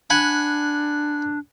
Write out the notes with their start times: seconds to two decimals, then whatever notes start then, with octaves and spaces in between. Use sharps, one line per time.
0.10 D4 F#5 G#5 B5